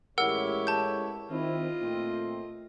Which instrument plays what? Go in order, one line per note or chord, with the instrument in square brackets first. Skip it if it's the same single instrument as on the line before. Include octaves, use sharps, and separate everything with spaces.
[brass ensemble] A1 G#3 C#5 [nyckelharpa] E4 G4 [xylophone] A#4 F#5 E6
[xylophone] A5 G6
[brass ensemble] D#3 C4 E4 [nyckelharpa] F4 D#5
[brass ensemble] A#2 A3 C4